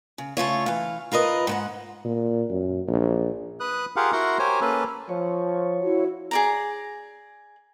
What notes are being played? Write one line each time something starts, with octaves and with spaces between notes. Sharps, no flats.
C#3
C#3 A3 F4 C#5
E3 F5
F4 A#4 B4 D#5
G#2 B4 F#5
A#2
F#2
A#1
B4 D#6 F#6
F4 G4 G#4 A#4 F5 F#5
E4 F#4 A#4 F#5 A#5 C6
G4 A#4 C5 C#5 G#5
A#3 C#4 A4 B4
F3 C#5
E4 F#4 F#5
G#4 D5 A#5